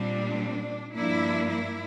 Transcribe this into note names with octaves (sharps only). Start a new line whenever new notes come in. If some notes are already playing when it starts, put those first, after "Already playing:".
Already playing: A#2 G3 C4 D4
G2 F3 A#3 D4 E4
E4